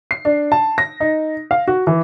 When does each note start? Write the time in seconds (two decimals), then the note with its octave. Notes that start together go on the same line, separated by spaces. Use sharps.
0.11 C7
0.25 D4
0.52 A5
0.78 A#6
1.00 D#4
1.51 F5
1.68 F#4
1.87 E3